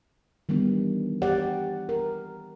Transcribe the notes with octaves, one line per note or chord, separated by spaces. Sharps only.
D#3 E3 G3 B3 D4
G4 D5 F#5
A#4